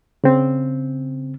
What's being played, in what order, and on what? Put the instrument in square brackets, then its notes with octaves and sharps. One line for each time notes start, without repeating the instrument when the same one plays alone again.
[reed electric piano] C#3 C4